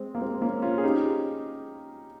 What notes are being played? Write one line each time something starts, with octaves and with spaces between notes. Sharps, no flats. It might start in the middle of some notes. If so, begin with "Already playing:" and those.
Already playing: G#3 C4
A#3
G#3 C4
A#3 C#4
C#4 F4
G#4
D#4 G4